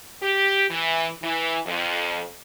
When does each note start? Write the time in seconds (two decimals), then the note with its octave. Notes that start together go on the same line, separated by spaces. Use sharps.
0.22 G4
0.70 E3
1.22 E3
1.66 F2